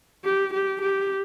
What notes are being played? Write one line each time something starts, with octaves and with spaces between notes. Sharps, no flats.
G4
G4
G4